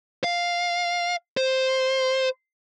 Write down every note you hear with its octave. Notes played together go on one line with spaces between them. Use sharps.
F5
C5